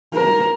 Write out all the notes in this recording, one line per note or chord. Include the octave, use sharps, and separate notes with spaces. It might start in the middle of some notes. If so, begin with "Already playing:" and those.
A#4